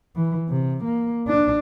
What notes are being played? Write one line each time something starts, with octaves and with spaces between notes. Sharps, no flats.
E3
C3
A#3
D4